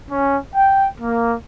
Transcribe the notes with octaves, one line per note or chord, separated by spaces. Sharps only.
C#4
G5
A#3